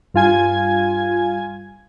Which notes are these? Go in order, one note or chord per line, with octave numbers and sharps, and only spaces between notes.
G2 F4 G#5 G#6